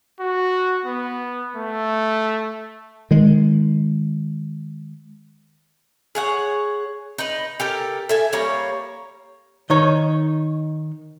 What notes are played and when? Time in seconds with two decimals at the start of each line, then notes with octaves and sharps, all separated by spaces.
0.20 F#4
0.86 B3
1.57 A3
3.11 D#3 G#3
6.15 G#4 C#5 F#5
7.18 D#4 B4
7.60 G4 A4 A#4
8.09 A4 E5 G#5
8.33 G3 A#3 C#5 A#5
9.70 D#3 D#4 C#5